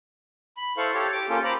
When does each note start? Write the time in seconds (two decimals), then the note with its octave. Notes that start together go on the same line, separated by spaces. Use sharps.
0.57 B5
0.77 E4 A4 C5 F5 C#6
0.94 G4 A4 C#5
1.13 G4 D6
1.29 A#3 C#4 F4 G4 A4
1.44 C5 A#5 B5 D6